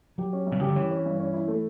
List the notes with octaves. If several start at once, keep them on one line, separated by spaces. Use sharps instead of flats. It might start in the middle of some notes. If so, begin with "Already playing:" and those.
F#3 G4
C#4
G2
B2
C#3 G4
D3
E3 C#4
C#4
G2
C#4
E4
A3